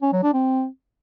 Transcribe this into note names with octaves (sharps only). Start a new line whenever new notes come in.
C#4
F#3
D4
C4